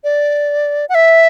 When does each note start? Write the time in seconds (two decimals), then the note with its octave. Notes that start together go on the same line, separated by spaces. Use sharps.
0.04 D5
0.89 F#5
0.95 E5